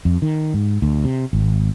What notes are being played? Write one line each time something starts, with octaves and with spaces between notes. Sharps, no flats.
F2
D#3
G#2
D2
C3
G#1